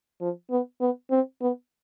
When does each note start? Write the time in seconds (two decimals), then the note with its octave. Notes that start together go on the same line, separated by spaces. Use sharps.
0.21 F3
0.51 B3
0.81 B3
1.11 C4
1.41 B3